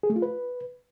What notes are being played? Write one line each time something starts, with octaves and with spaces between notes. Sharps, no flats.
G#4
A3
F4
B4